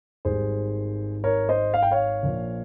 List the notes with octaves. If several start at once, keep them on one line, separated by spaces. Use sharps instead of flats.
G#1 G#2 G3 G#4 C5
A#4 C#5
C5 D#5
F5
G5
C#5 F5
A#1 A#2 F3